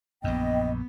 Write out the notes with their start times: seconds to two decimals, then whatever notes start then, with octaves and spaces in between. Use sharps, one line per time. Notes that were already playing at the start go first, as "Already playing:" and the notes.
0.24 A#1 F#2 B3 D#5 G5